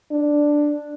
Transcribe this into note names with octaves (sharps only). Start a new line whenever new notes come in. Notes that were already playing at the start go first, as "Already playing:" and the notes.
D4